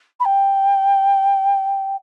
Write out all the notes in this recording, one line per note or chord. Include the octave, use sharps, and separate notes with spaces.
B5
G5